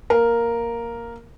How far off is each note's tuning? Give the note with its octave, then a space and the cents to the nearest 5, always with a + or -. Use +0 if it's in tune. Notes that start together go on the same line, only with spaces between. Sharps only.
A#3 +0 A#4 +0